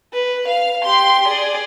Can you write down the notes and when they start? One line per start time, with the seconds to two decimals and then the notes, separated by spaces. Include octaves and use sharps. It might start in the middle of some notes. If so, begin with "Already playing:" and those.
0.13 B4
0.48 F5
0.84 G4 C6
1.27 G#4 D5